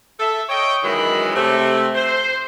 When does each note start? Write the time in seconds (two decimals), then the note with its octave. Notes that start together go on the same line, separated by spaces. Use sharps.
0.20 A4 E5
0.49 C#5 D#5 G5
0.83 F#2 D#3 E3 G#3 F4 B5
1.35 C3 A3 C4
1.95 C5